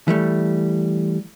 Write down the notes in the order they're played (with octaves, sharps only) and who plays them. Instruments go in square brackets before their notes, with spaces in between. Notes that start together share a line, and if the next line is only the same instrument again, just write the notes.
[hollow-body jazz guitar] E3 G3 A3